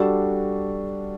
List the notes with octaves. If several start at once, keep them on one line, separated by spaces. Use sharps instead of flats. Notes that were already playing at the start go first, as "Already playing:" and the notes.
Already playing: G3 D4 F#4 A4